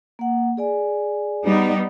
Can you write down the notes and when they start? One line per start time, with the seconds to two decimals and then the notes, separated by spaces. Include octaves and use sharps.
0.19 A#3 F#5
0.57 G#4 D5 G#5
1.45 G3 B3 D#4